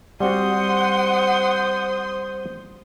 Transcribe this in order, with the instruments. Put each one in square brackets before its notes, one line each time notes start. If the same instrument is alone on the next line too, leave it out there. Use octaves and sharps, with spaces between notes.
[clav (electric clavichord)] G3 C4 F#4 [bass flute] C5 [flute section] F#5 [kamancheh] C6 D#6